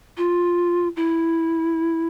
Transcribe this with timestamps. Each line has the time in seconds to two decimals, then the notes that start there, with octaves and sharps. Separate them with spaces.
0.17 F4
0.96 E4